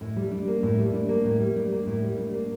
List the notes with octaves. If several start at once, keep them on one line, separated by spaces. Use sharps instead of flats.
A2
G3
D4
A#3
A2
G3
D4
A#3
A2
G3
D4
A#3
A2
G3
D4
A#3